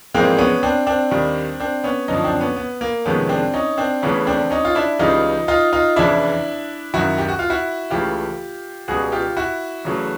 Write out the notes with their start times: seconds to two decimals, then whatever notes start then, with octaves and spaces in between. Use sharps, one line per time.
0.14 A#1 G#2 E3 G#3 A#3 C4
0.38 B3 C#4
0.63 C4 D4
0.87 C4 D4
1.11 D#2 D#3 G3
1.60 C4 D4
1.84 B3 C#4
2.08 F#2 D3 F3 C#4 D#4
2.24 C4 D4
2.40 B3 C#4
2.57 B3
2.81 A#3
3.05 F2 C3 D#3 G#3 B3 C#4
3.29 C4 D4
3.54 C#4 D#4
3.78 C4 D4
4.02 E2 C#3 E3 A3 B3 C#4
4.27 C4 D4
4.50 C#4 D#4
4.65 F4
4.75 D4 E4
4.99 C#2 C#3 E3 G3 D#4 F4
5.48 D#4 F4
5.73 D#4 F4
5.96 F1 E2 C#3 E3 D4 E4
6.94 F#1 F#2 D#3 E4 F#4
7.18 G4
7.29 F#4
7.39 F4
7.50 E4 F#4
7.90 C#2 C#3 E3 A3 F4 G4
8.88 C#2 B2 G3 F#4 G#4
9.12 F4 G4
9.37 E4 F#4
9.85 E2 C#3 F#3 A3